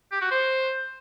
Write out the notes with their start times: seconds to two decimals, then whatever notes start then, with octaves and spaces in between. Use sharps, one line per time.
0.12 G4
0.22 F#4
0.31 C5